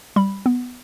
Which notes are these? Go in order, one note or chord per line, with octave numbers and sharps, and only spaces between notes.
G3 B5
B3